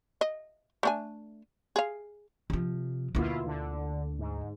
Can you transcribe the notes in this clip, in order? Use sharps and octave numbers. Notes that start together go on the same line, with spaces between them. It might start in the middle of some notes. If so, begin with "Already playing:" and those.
D#5
A3 D4 G#5
G#4 F5
C3 F3
D2 B2 A#3 E4 F4
D3
G#2